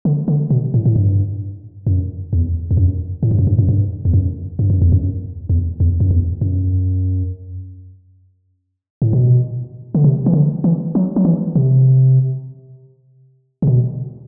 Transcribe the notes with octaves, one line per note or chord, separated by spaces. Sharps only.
D3
D3
B2
A2
A2
G2
F#2
E2
E2
F#2
A2
G2
F#2
G2
F#2
G2
E2
F#2
G2
F#2
E2
F#2
E2
E2
F#2
E2
F#2
A2
B2
D3
C3
E3
D3
E3
F#3
F#3
E3
C3
C3
B2